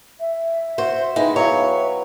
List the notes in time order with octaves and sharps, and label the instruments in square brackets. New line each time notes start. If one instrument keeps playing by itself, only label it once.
[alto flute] E5
[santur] F#4 [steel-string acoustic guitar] C5
[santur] G#3 B4 G5 [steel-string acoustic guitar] D#4
[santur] F#3 B3 F5 [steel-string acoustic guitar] C#5